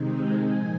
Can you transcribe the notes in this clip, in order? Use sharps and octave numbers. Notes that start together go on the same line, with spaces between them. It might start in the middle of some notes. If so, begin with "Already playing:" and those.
Already playing: C3 D#3 G#3 C4 D#4
G#5
A#2 F3 G#5